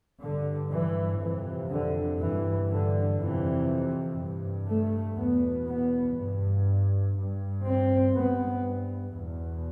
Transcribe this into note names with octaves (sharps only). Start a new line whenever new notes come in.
G2 D3
E3
F2 C3 E3
D3
G2 E3
D3
F2 C3 E3
G2
A3
E2 B2 B3
B3
G2
G2
C4
G2 B3
E2 B2